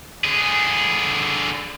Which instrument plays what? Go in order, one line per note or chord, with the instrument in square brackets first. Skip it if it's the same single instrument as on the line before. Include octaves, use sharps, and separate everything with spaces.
[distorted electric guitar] D3 G#4